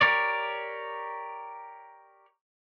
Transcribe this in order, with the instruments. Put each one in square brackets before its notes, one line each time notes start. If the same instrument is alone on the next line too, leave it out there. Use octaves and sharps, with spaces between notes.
[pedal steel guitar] G4 A#4 C#5 D5